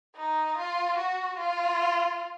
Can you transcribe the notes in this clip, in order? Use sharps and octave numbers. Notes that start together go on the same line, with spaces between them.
D#4
F4
F#4
F4